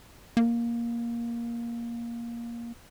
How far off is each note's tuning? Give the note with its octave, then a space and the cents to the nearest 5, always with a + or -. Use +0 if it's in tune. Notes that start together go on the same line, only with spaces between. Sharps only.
A#3 +10